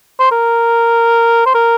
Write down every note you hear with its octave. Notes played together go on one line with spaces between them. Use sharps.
C5
A#4
C5
A#4